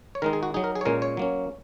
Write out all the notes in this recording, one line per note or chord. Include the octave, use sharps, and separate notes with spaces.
C#5
D#3 G#3 D#4 A#4
G#4
F#4
F#3 D#4 G#4
A#4
G#4
C#5
A#2 G#3 C#4 A#4
C#5
F#3 A#3 C#4